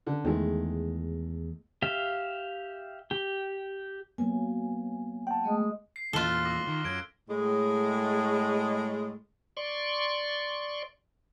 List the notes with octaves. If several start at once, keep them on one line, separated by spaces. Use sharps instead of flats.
D3
E2 D#3 G#3 A3
G4 E5 F5
G4
F#3 A#3 B3 G#5
F#5 G5 A5
G#3 A3 B3
C7
E2 A#2 E3 F4 A4 F#6 B6 G7
F6
D6 E6 A#6
D#3
F#2 F#6 G#6 D7
A2 G#3
D5 C6 C#6